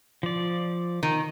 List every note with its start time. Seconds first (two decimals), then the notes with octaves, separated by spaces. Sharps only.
0.23 F3 D5
1.03 D#3